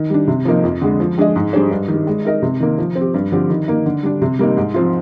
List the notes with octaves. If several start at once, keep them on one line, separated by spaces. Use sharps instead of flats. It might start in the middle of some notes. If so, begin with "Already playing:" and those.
Already playing: D#3
G3 D4
C3
F3 A#3 D#4
F2
D3 G#3
F3
G#3 D4 G#4 D#5
G#2
G3 D4 G#4 C5
G2
D#3 G3
G#3
D#4 A#4 D#5
C3
D#3 A#3
F3
C4
G4
G2
D3 F3 C4 G4
D#3
A#3 D#4
D3
G3 D4
C3
G3 A#3 D#4
G#2
F3 C4 F4